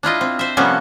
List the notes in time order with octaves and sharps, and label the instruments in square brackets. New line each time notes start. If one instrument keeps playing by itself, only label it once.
[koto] D4 E4 F4 D#5
C4
C5 E5
C3 F3 G3 A#3 B3 C#4